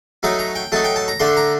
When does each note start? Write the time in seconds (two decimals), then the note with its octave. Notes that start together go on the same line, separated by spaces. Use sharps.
0.23 F#3 A3 D#4 A#5
0.39 A#5
0.55 G5
0.72 F#3 A3 D#4 A5
0.84 G5
0.96 A5
1.08 A#5
1.20 D3 A3 D4 C6
1.37 A#5